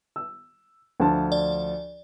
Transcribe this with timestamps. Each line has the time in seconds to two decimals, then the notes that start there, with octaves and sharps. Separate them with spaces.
0.16 E6
1.00 D2 F3 A5
1.32 D5